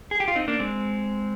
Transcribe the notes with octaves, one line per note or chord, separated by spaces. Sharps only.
G#4
G4
F4
C4 D#4
A#3 D4
G#3 C4